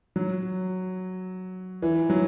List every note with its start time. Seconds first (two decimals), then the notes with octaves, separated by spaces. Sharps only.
0.16 F#3
1.82 E3
2.10 F#3